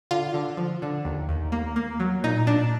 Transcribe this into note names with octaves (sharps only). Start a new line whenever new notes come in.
D3 F4
D3
F3
D3
D#2
D#2
A#3
A#3
F#3
A#2 D#4
A#2 D4